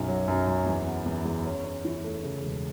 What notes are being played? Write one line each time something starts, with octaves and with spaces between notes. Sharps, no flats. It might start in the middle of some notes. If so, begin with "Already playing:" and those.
Already playing: B1 F#2
F#3
F#2
F#2
E2
B3
E2
E2
C#4
C#4
E3
A3
C#3
E1